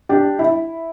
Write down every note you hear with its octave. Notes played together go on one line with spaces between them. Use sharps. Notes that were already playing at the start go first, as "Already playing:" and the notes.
D4 G4
E4